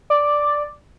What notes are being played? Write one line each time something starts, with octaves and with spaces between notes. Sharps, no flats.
D5